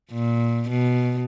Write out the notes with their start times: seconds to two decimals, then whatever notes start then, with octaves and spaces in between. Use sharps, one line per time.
0.12 A#2
0.69 B2